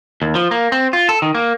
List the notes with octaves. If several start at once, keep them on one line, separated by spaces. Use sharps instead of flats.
D#2
F3
A#3
C4
F4
A4
D#3
A#3